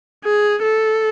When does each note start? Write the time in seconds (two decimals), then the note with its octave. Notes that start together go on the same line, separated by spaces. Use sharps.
0.25 G#4
0.63 A4